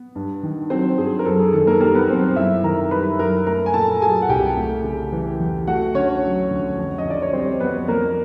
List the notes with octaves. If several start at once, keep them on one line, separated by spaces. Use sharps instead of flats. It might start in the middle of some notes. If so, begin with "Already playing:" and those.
Already playing: B3
G2
D#3
F#3 C4 C5
G2 G#4
A#4
F#2 A4
G#4
D#3 A4
A#3 A#4
G3 A#3 A#4
B3 B4
F#2 C4 C5
F#2 E4 E5
D#3 A#4 A#5
G3 B4 B5
F#2 A#4 A#5
A3 A#4 A#5
G#5
A#2 A4 A5
F#3 G#4 G#5
F#5
C2 G4 G5
A3
C#3
E3
E2
A3 F#4 F#5
D3 C#4 C#5
F#3
D2
F2
D#5
D3 D5
C#5
G3 C4 C5
F2 B3 B4
F2 A#3 A#4